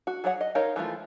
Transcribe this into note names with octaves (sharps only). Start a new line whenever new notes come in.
F#4
F#3 G#4 C#5 F#5
D#5
D#4 A#4 C#5 D#5 F5
E3 F3 G#3 A3 F4